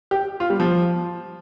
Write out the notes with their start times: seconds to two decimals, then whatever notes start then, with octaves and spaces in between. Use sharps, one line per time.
0.11 G4
0.40 F4
0.50 G3
0.60 F3